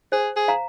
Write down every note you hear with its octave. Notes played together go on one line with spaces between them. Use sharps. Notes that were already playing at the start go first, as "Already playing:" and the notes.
G#4 C5
G#4
F5 A#5